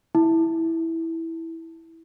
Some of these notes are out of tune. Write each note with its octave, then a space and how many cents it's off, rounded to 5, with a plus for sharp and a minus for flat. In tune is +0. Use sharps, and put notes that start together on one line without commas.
E4 -10